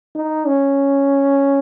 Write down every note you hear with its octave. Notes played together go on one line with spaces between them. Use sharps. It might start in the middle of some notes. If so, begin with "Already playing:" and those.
D#4
C#4